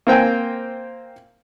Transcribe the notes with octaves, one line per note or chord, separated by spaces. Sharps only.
A#3 C4 G5 G#5